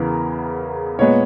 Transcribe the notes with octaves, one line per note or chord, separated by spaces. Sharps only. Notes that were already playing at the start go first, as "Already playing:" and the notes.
Already playing: E2 C#3 E3 B3 A#4
A#2 G#3 B3 C#5